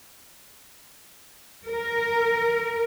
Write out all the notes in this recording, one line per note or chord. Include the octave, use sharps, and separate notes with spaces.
A#4